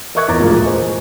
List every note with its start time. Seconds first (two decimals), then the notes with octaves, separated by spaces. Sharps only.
0.15 A#4 D#5 E5 C#6 F#6 G#6
0.28 E2 F4 A#4 A#5 D6 A6
0.40 D2 A#2 F3 G#3 A#3
0.64 C5 D#5 G#5